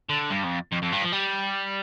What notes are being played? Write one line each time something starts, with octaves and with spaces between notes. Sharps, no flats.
D3
G2
F2
F2
F2
G2
F3
G3